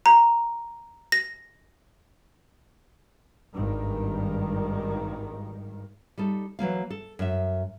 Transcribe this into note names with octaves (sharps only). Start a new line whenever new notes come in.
A#5
A#6
G#1 G2 D#3
G3 D#4 A4
E3 F#3 A#3 F5
A4
F#2 E5